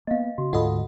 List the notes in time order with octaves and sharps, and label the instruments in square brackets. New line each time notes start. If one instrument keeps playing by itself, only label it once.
[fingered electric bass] A#3 B3 [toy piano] D#5 F5
[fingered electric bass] C#3 [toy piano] F#4
[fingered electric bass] D2 G#2 [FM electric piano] F4 A4 D#5 [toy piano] F#5 B5